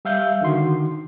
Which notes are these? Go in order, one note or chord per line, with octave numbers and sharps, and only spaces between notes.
G3 E5 F5 G6
D3 D#3 F#4 C6